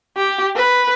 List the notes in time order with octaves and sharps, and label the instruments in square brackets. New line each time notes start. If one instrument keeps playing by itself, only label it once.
[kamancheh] G4
B4